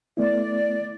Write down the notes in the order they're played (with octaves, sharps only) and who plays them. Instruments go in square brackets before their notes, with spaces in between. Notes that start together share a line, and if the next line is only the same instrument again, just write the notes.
[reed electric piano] A3 B3 E4 [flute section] D5